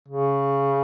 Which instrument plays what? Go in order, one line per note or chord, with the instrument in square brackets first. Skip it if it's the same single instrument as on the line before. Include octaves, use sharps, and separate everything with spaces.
[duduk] C#3